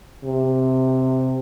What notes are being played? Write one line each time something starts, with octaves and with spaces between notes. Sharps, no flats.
C3